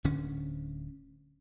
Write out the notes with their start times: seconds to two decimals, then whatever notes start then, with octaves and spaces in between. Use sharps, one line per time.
0.04 D1 D3 C#4